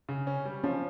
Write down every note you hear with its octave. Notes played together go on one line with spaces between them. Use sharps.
C#3
C#4
G3
F3 C#4